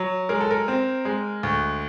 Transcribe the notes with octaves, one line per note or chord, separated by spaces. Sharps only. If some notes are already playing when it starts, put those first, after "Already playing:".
Already playing: F#3
G#3 A#4
A4
A#4
C4
G#3
D2